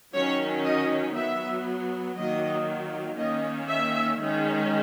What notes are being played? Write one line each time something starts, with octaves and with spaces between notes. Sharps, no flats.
D#3 F#3 C#4 C#5
D#5
F#3 B3 E5
D#3 F#3 A#3 D#5
D#3 A#3 C#4 D#5
E5
D#3 G#3 C#4